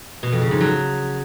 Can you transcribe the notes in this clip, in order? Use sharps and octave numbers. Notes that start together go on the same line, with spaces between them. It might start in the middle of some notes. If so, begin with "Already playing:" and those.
B2
F2
C#3
G#2
F#3